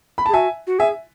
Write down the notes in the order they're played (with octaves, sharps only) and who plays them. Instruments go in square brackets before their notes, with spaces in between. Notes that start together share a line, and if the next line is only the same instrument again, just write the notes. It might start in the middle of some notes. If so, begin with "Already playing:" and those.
[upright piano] B5
A5
[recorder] G#4
[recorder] F#4 [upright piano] E5 G#5
[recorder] F#4
[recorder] G#4 [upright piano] E5 G#5